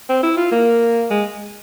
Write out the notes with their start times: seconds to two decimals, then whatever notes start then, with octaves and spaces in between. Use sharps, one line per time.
0.09 C4
0.23 E4
0.37 F4
0.52 A#3
1.11 G#3